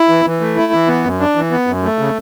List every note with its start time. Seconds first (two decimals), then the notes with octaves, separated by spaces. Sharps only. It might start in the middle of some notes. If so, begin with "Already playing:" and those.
Already playing: E4
0.09 E3
0.25 E3
0.41 A3
0.56 E4
0.73 E3
0.88 B3
1.04 F#2
1.20 D4
1.35 E3
1.51 B3
1.67 F#2
1.83 A3
1.98 C#3